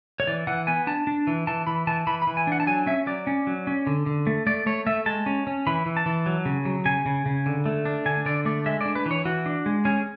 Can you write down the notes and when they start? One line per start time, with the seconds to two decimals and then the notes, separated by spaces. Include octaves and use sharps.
0.20 C#5
0.27 E3 D5
0.47 E3 F#5
0.67 B3 G#5
0.87 D4 A5
1.07 D4
1.27 E3
1.47 E3 A5
1.67 E3 B5
1.87 E3 A5
2.07 E3 B5
2.22 B5
2.27 E3
2.37 G#5
2.47 D4 F#5
2.60 A5
2.67 F#3 G#5
2.87 C#4 E5
3.07 F#3 D5
3.27 C#4
3.47 F#3
3.67 C#4
3.87 D3
4.06 D3
4.27 A3
4.47 A3 D5
4.66 A3 C#5
4.86 A3 E5
5.06 G#3 A5
5.26 C#4
5.47 C#4
5.67 E3 B5
5.86 E3
5.97 A5
6.06 E3
6.26 F#3
6.45 C#3
6.65 F#3
6.85 C#3 G#5
7.06 C#3
7.26 C#3
7.46 D3
7.66 A3
7.85 D4
8.06 D3 G#5
8.26 D3 D5
8.45 A3 D5
8.66 G#3 E5
8.81 D4 D5
8.95 B4
9.06 E3
9.11 C#5
9.25 E3 F#4
9.46 D4
9.66 G#3
9.85 C#4 G#4